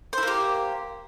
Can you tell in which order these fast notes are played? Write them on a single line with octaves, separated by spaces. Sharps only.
C5 E4 A#3 G4